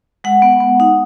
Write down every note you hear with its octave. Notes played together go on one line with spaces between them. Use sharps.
G#3 F#5
B3
B3
D#4